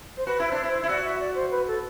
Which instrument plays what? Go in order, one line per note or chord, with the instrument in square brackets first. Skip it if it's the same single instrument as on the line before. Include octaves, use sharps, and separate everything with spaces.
[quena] C5
[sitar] F#4 [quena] B4
[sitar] E4
[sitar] D4 [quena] C5
[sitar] E4
[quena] C5
[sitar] E4
[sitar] F#4 [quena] D5
[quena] E5
D5
C5
B4
A4